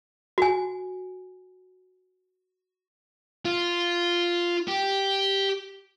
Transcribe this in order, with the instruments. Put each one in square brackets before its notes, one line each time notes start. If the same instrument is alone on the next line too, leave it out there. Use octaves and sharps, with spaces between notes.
[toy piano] F#4 G#5
[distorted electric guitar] F4
G4